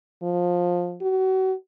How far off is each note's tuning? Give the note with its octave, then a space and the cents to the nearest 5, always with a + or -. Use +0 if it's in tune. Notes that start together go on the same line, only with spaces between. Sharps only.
F3 +15
F#4 +35